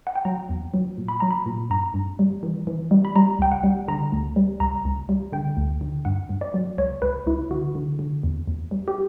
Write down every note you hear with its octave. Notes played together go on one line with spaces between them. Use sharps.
F#5
G5
F#3 A#5
E2
F#3
A#2
B5
F#3 A#5
B5
A#2
G2 A#5
G2
G3
E3
E3
G3
B5
G3 A#5
C#2 G5
F#5
G3
D3 A#5
D2
G3
C#2 A#5
C#2
G3
D3 G5
D2
D3
G2 F#5
G2
D5
F#3
C#2 C#5
C#2 B4
C#2 E4
D3 F#4
D3
D3
E2
E2
G3
G4